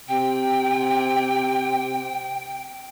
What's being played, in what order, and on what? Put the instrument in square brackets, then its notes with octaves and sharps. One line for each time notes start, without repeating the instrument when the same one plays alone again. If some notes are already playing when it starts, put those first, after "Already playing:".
[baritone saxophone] C3 [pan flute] G5